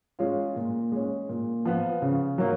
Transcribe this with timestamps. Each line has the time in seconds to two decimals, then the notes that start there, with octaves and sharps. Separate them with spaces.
0.19 G#3 C#4 F4
0.56 A#2
0.92 G#3 C#4
1.29 A#2
1.65 F3 B3 F4
2.02 C#3
2.38 F#3 A#3